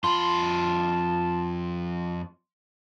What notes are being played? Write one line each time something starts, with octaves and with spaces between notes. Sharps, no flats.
F2 F4 A5 B5 C6